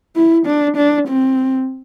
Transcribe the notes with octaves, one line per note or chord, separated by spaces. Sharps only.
E4
D4
D4
C4